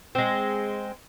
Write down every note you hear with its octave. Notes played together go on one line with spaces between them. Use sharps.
G#3 C4